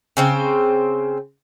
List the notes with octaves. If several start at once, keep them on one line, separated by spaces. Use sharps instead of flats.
C#3 C4 C5